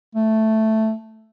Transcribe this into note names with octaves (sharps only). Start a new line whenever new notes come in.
A3